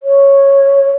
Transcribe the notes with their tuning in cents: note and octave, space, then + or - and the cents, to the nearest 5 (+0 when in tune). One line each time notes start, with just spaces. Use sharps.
C#5 -5